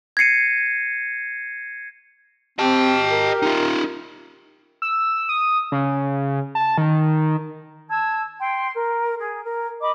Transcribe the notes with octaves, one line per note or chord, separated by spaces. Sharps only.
G#6 A#6 C7 C#7 D#7
C4 G4 D#5 A5
A#4
D#4 F4
E6
D#6
C#3
A5
D#3
A5 E6 G#6
G5 C6
A#4
G#4
A#4
D#5 B5 D6